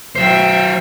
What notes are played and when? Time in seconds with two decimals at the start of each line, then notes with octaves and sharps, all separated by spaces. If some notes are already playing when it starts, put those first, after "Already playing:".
0.16 F#3 C5 E5 G5